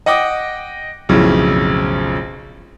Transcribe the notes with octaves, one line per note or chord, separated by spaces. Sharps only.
D#5 F#5 G5 D6 D#6
B1 F2 A2 C#3